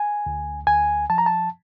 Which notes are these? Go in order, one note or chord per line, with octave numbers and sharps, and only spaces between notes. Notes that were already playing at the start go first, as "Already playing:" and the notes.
Already playing: G#5
D2
D2 G#5
F3 A5
A#5
A5